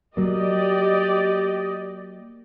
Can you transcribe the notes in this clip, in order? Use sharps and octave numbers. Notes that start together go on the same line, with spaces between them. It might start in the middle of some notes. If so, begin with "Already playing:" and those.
F#3 A#3 G4 D5 D#5